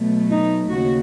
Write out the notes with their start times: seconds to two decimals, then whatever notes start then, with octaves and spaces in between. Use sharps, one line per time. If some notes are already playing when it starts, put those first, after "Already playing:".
Already playing: B2 F#3 A3
0.30 D#4
0.70 D#2 C#3 F#4